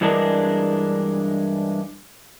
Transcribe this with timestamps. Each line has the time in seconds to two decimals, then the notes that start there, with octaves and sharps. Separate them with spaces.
0.01 G2 E3 G#3 D4 G#4 A#4